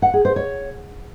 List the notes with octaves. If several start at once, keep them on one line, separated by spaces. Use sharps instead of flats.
F#5
G#4
C5
C#5